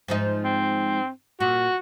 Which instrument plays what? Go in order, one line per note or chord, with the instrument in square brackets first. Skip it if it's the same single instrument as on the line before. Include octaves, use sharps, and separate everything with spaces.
[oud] G#2 F3 D#4
[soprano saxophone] C4
[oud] A#2 [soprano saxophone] F#4